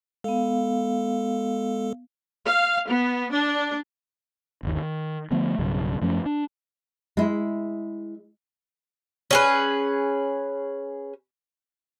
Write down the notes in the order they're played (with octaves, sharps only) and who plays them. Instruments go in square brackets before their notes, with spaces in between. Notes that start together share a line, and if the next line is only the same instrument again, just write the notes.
[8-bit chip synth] G#3 A4 [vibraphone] B3 F5
[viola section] F5
B3
D4
[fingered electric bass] G1 D#2
D#3
D3 F3 A3 B3
B1 G2 C#3 F#3
F#2 F3 A3 C#4
D4
[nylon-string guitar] G#3 E4
[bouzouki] C#4 G#4 B4